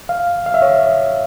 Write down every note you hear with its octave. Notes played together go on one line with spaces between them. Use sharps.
F5
F5
E5
C#5